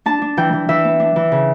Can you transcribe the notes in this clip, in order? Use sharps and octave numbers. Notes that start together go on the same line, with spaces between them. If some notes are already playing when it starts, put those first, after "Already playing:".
D4 A5
D4
E3 G5
E3
E3 E5
B3
D4
E3
C#3